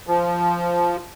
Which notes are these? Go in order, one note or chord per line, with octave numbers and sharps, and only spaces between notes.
F3